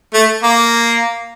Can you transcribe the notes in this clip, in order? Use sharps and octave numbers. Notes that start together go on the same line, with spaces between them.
A3
A#3